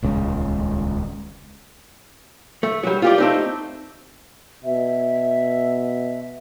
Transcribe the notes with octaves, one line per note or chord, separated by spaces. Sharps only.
D#1 C#2 C#3 G#3
A3
F#3 G3
F4 G4 D5
A3 C4 D#4
B2 E5